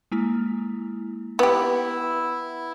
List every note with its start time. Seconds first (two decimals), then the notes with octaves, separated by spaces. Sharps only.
0.12 G#3 A#3 E4
1.39 B3 E4 G4 B4 F#5